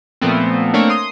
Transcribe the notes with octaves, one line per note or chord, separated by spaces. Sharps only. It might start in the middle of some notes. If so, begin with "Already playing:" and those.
A#2 F3 A3 B3 C4
A3 A#3 C4 D4 A#4 C#5
C6 D#6